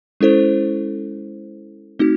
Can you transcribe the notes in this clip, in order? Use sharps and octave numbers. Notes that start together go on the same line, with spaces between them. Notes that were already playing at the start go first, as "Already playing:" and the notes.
G#3 C#4 E4 A4 C5
A3 C4 D#4 F#4